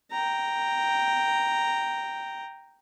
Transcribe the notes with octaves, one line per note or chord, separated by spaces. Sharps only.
G5 A#5